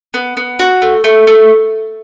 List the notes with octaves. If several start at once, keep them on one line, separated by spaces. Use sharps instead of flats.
B3
B3
F#4
A3
A3
A3